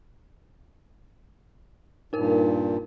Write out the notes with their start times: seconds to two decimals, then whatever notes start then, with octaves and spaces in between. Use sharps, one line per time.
2.13 G2 A#2 D#4 A#4